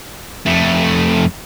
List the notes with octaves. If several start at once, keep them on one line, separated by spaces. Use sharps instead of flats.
F2 A3